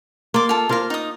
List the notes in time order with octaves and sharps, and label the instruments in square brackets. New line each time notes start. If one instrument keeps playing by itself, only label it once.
[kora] A#3 D5 [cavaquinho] C6 D6
[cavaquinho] F4 A4
[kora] A#3 F4 A#4 [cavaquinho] C5 F5
[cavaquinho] D#4 D#6